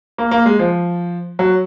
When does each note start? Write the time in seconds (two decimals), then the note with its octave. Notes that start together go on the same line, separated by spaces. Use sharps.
0.18 A#3
0.31 A#3
0.46 G#3
0.59 F3
1.39 F#3